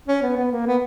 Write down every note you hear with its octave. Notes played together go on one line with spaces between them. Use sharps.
C#4
B3
B3
A#3
B3